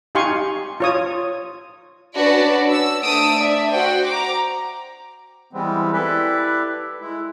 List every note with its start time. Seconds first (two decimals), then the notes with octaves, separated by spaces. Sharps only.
0.15 D#4 G4 F5 G#5 C6 C#6
0.80 F4 C#5 D#6
2.17 C#4 D4 F#4 B4 D5 A5
2.70 E6
3.03 A3 D4 C5 D#6 E6 D7
3.39 D5 E5
3.72 F#4 C5 F#5 G5
4.08 A#5 D6
5.53 E3 G3 G#3 B3 C4
5.93 E4 G4 A4 B4 D5 E5
7.00 G#3 E4